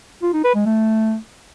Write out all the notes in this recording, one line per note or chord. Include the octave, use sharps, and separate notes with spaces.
F4
D#4
B4
G#3
A3